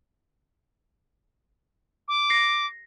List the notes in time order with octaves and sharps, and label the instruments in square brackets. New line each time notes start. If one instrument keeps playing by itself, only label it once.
[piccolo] D6
[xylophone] A#6 C7